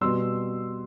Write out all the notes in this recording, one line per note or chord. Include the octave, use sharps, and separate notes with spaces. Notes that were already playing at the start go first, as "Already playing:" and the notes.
B2 G3 C6 E6